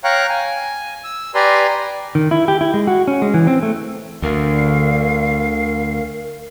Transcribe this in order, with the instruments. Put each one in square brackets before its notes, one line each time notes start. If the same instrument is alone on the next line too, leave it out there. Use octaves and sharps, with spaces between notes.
[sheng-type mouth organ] C#5 F5 G5 A#5 C#6 F#6
G#5
E6
G4 B4 D5 G#5 A#5 C6
[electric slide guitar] D#3
E4
G4
E4
G#3
F#4
C#4
G#3
E3
C4
A3
[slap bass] D2 [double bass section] D3 [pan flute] A#4 [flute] F5